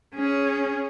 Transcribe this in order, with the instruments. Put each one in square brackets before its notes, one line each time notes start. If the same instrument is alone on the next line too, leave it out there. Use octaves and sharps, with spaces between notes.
[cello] C#4 G#4